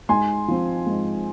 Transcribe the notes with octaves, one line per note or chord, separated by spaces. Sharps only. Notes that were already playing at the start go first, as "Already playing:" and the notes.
G#2 G#5 C6
F3 C4
G#2